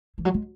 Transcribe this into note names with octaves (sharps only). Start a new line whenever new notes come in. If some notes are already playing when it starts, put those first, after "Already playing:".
E3
F#3
G#3